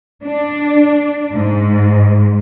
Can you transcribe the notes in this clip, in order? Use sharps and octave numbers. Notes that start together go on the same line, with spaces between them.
D4
G#2